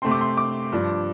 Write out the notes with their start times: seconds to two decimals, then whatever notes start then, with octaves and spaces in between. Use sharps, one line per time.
0.02 C3 A3 C4 C6
0.11 D6
0.21 C6
0.37 D6
0.72 G2 F3 D4